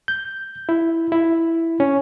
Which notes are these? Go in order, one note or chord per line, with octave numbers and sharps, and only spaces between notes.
G6
E4
E4
C#4